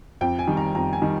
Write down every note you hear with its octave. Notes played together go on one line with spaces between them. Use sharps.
F2 G5
G#5
D#3 G3
A#5
F2 A#5
G#5
D#3 G3